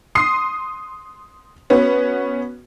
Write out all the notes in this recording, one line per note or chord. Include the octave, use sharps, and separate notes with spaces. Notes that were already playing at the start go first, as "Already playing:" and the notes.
C6 D#6 C7
B3 C#4 F#4 B4